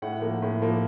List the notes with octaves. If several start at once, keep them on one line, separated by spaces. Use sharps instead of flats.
A2 F#5
F3 A#3
A2
F3 A#3